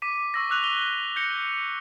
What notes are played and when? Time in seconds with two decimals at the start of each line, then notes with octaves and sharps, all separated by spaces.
0.02 D6 B6 D#7
0.34 C#6 E6 A#6
0.50 D6 E6 F#6 F7
0.63 F7 G7
1.16 G6 A#6 C#7 G7